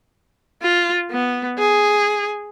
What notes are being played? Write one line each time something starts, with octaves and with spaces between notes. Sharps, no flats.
F4
B3
G#4